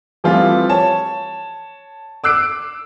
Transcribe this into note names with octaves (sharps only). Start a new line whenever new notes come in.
E3 F3 G3 A3 C4 F4
C#5 A5
D6 E6 F#6 C7 D7